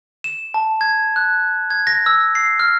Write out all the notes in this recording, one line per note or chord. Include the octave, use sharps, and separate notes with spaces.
E7
A5
G#6
F#6
G#6
A#6
E6
C7
F6